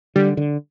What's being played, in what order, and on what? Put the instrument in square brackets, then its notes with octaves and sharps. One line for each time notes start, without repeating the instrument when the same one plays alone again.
[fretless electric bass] D3 [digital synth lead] G3
[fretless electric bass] D3